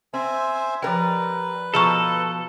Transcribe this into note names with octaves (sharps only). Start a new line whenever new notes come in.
C4 C5 E5 G#5
F3 G3 A#4 B4 G5
B2 F3 G#4 A4 A#5 C#6